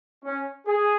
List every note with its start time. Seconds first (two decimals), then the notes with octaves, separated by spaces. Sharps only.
0.25 C#4
0.67 G#4